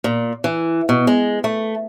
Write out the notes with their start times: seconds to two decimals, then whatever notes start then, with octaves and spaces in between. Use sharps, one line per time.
0.04 A#2
0.44 E3
0.89 B2
1.07 G#3
1.44 A3